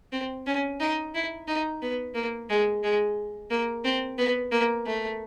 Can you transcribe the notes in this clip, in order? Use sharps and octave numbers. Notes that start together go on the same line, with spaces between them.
C4
C#4
D#4
E4
D#4
B3
A#3
G#3
G#3
A#3
C4
B3
A#3
A3